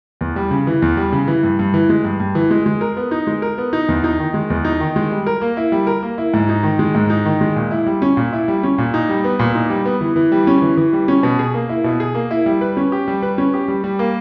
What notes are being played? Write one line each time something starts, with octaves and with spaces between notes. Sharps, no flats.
E2
G3
C#3
E3
E2
G3
C#3
E3
G2
G2
E3
G#3
G2
G2
E3
G#3
G#3
A#4
B3
D#4
G#3
A#4
B3
D#4
E2
D#4
D#3
G#3
E2
D#4
D#3
G#3
G3
A#4
A#3
E4
G3
A#4
A#3
E4
G#2
D#4
D#3
G#3
G#2
D#4
D#3
G#3
A#2
E4
G3
C#4
A#2
E4
G3
C#4
A#2
D#4
G3
B3
A#2
D#4
G3
B3
E3
E3
G3
C#4
E3
E3
G3
C#4
B2
G#4
A#3
E4
B2
G#4
A#3
E4
G3
B4
C#4
G4
G3
B4
C#4
G4
G3
G3
A#3